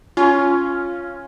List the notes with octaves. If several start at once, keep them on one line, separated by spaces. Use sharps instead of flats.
C#4 F4